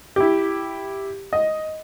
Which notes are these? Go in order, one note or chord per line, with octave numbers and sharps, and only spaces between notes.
E4 G4
D#5